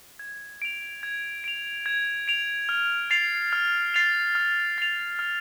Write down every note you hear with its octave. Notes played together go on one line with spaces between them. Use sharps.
G#6
D7 F7
G#6
D7 F7
G#6
D7 F7
F6
A6 C7 F7
F6
A6 C7 F7
F6
A6 C7 F7
F6